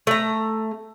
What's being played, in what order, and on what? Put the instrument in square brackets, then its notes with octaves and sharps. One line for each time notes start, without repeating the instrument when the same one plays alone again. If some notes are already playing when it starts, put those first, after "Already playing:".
[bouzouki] A3 A#5